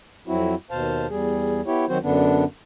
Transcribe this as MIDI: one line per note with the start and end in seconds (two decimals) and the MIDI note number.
0.27 0.55 41
0.27 0.55 54
0.27 0.55 60
0.27 0.55 64
0.27 0.55 66
0.71 1.07 39
0.71 1.07 47
0.71 1.07 72
0.71 1.07 77
0.71 1.07 81
1.10 1.61 40
1.10 1.61 55
1.10 1.61 68
1.66 1.85 59
1.66 1.85 64
1.66 1.85 67
1.66 1.85 73
1.89 1.98 51
1.89 1.98 54
1.89 1.98 60
1.89 1.98 66
1.89 1.98 72
2.03 2.44 42
2.03 2.44 50
2.03 2.44 59
2.03 2.44 62